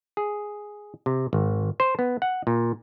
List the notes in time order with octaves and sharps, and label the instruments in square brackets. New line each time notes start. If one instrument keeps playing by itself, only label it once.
[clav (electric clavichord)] G#4
C3
G#1
C5
B3
F#5
A#2